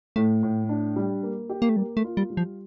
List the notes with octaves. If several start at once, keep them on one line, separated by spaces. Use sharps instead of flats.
A2 A3
A2
D4
G3
A#3
G4
A#3
A3
G3 A#3
A3
F4
G3
G3
F3